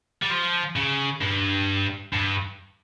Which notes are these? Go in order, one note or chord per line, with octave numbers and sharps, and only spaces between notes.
G3
F3
C#3
G2
G2